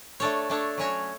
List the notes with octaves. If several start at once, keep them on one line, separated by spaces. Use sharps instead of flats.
A3 D4 A4 C#5
A3 D4 A4 C#5
F#3 C#4 F#4 C#5